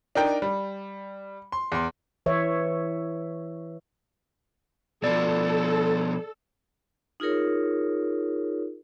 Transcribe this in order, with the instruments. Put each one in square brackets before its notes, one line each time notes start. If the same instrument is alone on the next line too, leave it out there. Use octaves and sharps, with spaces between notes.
[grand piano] D4 D#4 A#4 G5
G3
C6
E2 C6
[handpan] E3 C#5 E5
[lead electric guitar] B2 F3 [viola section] A4 [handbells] D5
[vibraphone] D#4 F4 G#4 A#4 C#5